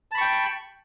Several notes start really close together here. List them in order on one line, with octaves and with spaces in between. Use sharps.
A5 B5 C#6 G5